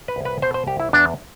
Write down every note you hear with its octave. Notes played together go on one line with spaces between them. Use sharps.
B4
C2
B4
B2 C5
C5
C2 G4
E4
E2 D4